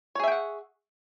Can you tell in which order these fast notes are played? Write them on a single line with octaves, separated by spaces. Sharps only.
C#5 G#4 E5 G5 F#5